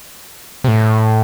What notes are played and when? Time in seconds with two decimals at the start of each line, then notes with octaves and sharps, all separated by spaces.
0.64 C3
0.68 A2